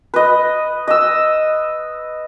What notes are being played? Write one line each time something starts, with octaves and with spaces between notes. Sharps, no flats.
B4 D#5
D#5 E6